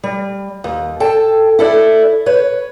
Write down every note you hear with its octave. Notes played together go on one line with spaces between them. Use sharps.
G3
D#2
A4 G5 A5
E4 A4 D5
B4 C#5